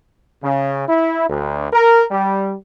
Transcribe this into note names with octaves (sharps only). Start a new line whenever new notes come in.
C#3
E4
D2
A#4
G3